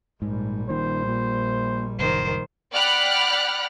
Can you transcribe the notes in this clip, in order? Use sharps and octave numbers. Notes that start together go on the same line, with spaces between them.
A#1 G#2 G3
A#2 D#3 C5
A#2
F#1 D#3 C5
D5 F#5 G5 B5 F6 F#6